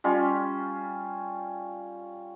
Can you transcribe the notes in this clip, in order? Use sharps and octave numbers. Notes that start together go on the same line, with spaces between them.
G3 C#4 F4